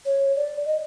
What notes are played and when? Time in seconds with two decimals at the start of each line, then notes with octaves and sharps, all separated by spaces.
0.06 C#5
0.36 D5
0.65 D#5